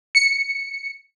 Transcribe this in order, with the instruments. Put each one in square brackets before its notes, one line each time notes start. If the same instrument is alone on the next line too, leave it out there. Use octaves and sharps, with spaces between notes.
[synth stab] C#7